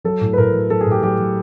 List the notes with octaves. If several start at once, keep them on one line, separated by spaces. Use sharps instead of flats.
F#3 A4
A2
B4
A2 A#4
F#3
F#3 A4
G#4
A2
G4
F#3 G4
F#3